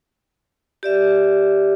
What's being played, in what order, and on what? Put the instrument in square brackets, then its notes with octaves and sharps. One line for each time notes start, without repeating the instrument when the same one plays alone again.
[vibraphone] G4 D5 E5